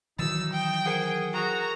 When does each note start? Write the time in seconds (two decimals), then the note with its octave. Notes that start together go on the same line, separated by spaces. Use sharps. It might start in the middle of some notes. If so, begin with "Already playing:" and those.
0.19 D#3 E3 F#3 D#4 E6 A6
0.53 G5
0.85 G#4 A#4 C5 F#5
1.34 F#4 G#4 A#4 A#5